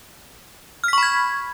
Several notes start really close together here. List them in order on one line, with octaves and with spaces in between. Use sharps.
F6 B6 C#6 B5 G#6